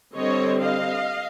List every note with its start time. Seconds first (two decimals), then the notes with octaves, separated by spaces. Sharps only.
0.16 D3 G3 C4 C#5 D#5
0.60 D#5 F5